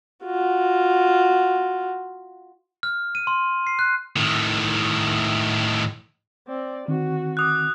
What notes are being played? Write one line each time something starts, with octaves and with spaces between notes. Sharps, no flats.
F4 F#4
F6
D#7
C6
C7
F#6
A2 D#3
C4 D5
D3 D#3 C4 F#4
D6 D#6 F#6